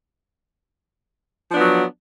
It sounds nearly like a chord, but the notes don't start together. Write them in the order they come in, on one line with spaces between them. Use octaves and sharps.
F3 D4 B3 F#3